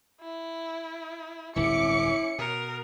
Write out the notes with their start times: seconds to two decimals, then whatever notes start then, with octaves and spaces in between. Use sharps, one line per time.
0.21 E4
1.56 D1 G1 C2 C#4 E4 D6 C#7
2.39 B2 A#4